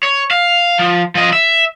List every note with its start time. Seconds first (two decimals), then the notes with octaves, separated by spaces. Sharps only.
0.03 C#5
0.31 F5
0.79 F3
1.15 F3 D#5
1.33 E5